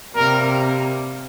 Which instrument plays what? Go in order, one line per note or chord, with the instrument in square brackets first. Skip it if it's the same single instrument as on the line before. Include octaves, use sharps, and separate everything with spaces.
[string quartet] C3 G3 A#3 [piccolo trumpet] A#4